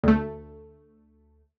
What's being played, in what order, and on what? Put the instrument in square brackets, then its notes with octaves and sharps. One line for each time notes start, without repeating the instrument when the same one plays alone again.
[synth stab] D2 A3